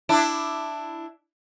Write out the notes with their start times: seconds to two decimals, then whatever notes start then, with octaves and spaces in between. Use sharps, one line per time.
0.09 D4 E4